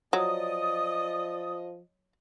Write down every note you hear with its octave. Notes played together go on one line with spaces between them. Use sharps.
F3 F#3 D5 D#5 D#6